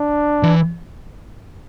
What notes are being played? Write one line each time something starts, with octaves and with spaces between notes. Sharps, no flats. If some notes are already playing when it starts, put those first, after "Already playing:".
Already playing: D4
E3